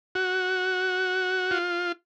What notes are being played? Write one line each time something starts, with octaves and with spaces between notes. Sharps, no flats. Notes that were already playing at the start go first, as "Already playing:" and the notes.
F#4
F4